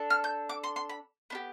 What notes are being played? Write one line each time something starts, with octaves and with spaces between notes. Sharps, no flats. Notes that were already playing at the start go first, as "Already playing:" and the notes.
Already playing: D4 A4
F6
G6
D6
C6
C6
B5
B3 D4 G4